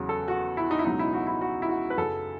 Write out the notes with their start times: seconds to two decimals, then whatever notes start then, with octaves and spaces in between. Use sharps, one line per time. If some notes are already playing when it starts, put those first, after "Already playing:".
Already playing: E2 C#3 F#3
0.09 A4
0.28 F#4
0.57 E4
0.71 D#4
0.79 E4
0.85 C#2 B2 F#3 D#4
0.99 E4
1.13 F#4
1.27 E4
1.41 F#4
1.62 E4
1.69 F#4
1.90 B4
1.98 F#2 C#3 F#3 A4